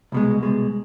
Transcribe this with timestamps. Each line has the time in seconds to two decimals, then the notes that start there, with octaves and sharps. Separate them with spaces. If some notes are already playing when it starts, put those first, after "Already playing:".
0.12 C2 B2 G#3
0.43 C2 B2 G#3